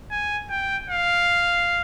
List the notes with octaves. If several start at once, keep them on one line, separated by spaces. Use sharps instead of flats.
G#5
G5
F5